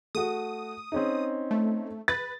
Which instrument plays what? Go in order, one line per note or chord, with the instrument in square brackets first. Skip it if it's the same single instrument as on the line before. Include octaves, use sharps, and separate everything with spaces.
[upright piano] A3 F#4 [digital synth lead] D#6
[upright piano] C4 C#4 D#4
[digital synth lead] A3
[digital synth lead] B4 [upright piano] A6